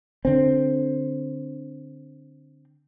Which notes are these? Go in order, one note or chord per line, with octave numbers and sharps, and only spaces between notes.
D3 C4